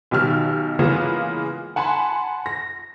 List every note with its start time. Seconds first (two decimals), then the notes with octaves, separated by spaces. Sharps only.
0.11 B1 B2 D#3 G4 E6 F6
0.79 C#3 E3 G#3 A#3 B3 F4
1.76 F#5 G#5 A5 B5 C6
2.46 A#6